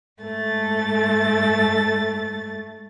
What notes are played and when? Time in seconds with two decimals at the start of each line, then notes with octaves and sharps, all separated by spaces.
0.22 G#2 A3 A6